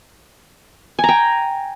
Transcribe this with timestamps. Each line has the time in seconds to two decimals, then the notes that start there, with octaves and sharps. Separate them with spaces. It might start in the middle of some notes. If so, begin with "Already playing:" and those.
0.99 G#5
1.04 A#5
1.09 G5